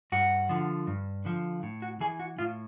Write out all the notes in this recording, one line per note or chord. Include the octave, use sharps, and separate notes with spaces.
G2 F#4
D3 F3
G2
D3 F3
A2
F#4
E3 G#4
F#4
A2 F4